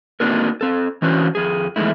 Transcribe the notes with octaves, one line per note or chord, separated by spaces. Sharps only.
A#3 C4 D4 D#4 F#4 A#4
C4 A4
E3 C#4 D4 F#4 C5
F2 G#4
E2 D#3 F3 G#3 A3 E4